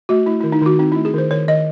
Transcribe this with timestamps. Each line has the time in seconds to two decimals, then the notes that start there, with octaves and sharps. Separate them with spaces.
0.09 A3 F#4
0.26 A3 E4
0.40 D#3 E4
0.52 D#4
0.61 D#3 F#4
0.79 C4 D#4
0.92 A3 E4
1.05 G#4
1.14 D#3 C5
1.31 D#3 C#5
1.48 D#3 D#5